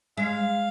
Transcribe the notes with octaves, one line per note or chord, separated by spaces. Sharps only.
G#3 F5